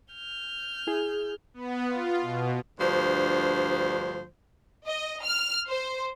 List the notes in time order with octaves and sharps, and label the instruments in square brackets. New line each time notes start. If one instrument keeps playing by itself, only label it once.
[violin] F6 G6
[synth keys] E4 G#4
[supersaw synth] B3
F4
B2
[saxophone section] D2 G2 F3 C5
[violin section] D#5
F6
C5